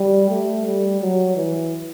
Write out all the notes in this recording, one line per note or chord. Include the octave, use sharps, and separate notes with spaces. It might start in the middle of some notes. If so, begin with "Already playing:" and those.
Already playing: G3
A3
G3
F#3
E3